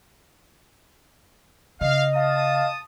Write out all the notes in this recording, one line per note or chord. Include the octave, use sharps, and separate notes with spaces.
C#3 D#5 F5
F5 A5 D#6